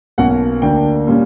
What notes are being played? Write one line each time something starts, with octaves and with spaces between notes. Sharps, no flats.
B1 B2 A#3 C#4 F#5
D2 D3 A#3 D4 G5
A#2 G3 C#4